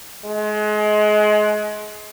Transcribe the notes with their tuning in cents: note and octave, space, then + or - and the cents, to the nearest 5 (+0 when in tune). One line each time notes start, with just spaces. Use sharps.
G#3 +30